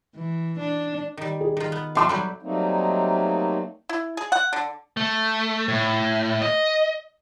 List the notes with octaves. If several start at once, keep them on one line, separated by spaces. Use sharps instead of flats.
E3
D4
D#3 G3
G#4
D#3 F4
B3
F#3 A3 F5 G5 A5 C6
F#3 G3 G4 B5
F#3 G3 A3 A#3 C4 D#4
E4
G#4
F#5
D3
A3
A2
D#5